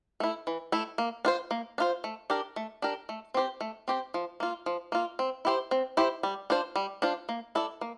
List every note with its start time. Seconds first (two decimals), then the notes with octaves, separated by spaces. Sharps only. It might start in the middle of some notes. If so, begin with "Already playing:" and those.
0.20 A3 E4
0.47 E3
0.72 A3 E4
0.98 A#3
1.25 D4 F4 C5
1.51 A#3
1.78 D4 F4 C5
2.04 A3
2.30 D4 G4 A#4
2.56 A3
2.82 D4 G4 A#4
3.09 A3
3.34 C4 G4 C5
3.61 A3
3.88 C4 G4 C5
4.14 F3
4.40 A#3 F4
4.66 F3
4.92 A#3 F4
5.19 C4
5.45 E4 G4 C5
5.71 C4
5.97 E4 G4 C5
6.23 G3
6.50 D4 F4 C5
6.76 G3
7.02 D4 F4 C5
7.29 A#3
7.55 E4 A4 D5
7.81 A#3